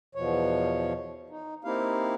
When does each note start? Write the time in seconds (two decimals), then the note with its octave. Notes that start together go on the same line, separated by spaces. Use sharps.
0.15 E2 B2 F3 C#5
1.30 D#4
1.64 A#3 C4 D#4 E4 G4 F5